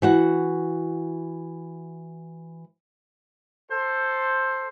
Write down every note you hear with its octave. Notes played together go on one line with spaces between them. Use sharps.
E3 F#4 F#5
A4 C5